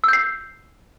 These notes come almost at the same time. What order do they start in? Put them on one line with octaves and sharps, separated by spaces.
E6 G6 C7